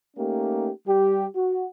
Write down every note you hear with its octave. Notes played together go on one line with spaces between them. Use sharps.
A3 A#3 C#4 D#4 G4
G3 G4
F#4